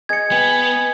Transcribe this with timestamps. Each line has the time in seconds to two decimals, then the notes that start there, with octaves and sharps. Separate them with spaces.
0.09 G#4 D#5 G#6 C#7
0.31 B3 G5 G#5